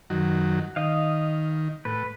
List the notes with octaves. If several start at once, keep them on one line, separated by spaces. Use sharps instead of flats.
F#2 D#3 F#3
D#3 D#5 F5
A2 B4